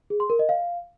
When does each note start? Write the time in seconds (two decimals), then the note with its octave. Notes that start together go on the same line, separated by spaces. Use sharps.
0.10 G#4
0.20 C6
0.30 A#4
0.39 D#5
0.49 F5